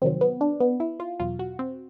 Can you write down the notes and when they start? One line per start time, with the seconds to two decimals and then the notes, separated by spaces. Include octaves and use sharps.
0.02 F2 C3 D#3 F#3 C4
0.21 B3
0.41 D4
0.60 B3
0.80 E4
1.00 F4
1.20 E2 B2 F#3 F4
1.39 F#4
1.59 C4